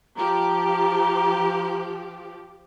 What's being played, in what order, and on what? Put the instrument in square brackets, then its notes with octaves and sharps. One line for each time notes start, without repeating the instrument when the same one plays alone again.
[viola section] F3 G4 [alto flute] A#5